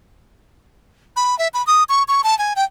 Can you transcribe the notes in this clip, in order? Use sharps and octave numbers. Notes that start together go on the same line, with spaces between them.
B5
E5
B5
D#6
C#6
C#6
A5
G#5
G5